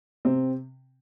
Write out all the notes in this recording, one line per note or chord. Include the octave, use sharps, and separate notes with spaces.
C3 C4